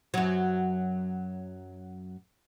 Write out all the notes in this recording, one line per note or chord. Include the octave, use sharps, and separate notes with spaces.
F#2 F#3